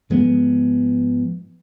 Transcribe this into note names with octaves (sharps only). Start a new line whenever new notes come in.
G#2 F3 G#3 B3